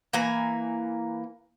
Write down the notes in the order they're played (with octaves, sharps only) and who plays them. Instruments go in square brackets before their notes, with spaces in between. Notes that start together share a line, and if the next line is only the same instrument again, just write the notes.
[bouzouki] E3 A#3 G#5 A#5